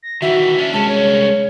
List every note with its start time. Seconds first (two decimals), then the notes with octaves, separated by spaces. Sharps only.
0.03 A#6
0.22 D#3 E3 F#4 E5
0.58 C#4 D4
0.73 C2 G#3 C#4 A5
0.89 C#5